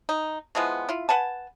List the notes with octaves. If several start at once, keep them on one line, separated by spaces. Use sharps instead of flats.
D#4
E3 F3 G#3 B3
E4 F4
B4 F#5 G#5 A5